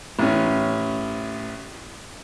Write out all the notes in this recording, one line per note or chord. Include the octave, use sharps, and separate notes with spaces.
A1 C#4